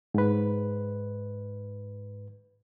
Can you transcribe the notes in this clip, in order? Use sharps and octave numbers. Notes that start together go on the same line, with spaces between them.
G#2 B4